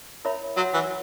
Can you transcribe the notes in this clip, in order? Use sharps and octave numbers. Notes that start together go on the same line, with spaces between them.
E4 A#4 C#5 E5 B5
F#3 F#4 C#5 F#5
E3